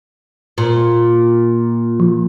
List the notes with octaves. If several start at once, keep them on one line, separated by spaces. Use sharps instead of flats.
A#2
F3